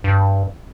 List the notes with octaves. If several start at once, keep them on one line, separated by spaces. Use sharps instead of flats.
G2